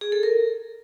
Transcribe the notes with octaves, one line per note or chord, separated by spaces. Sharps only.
G#4
A4
A#4